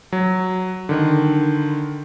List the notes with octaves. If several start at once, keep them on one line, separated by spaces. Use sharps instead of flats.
F#3
D3 D#3